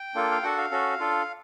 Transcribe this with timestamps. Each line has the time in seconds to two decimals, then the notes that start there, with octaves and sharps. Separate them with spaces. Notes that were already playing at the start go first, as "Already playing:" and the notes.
Already playing: G5
0.15 A#3 D4 F4 A4
0.31 F5
0.43 D4 F#4 A4 F#5
0.58 F5
0.71 C#4 F#4 A4
1.00 D4 F4 A4